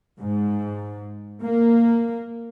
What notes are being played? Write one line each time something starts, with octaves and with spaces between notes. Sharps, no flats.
G#2
A#3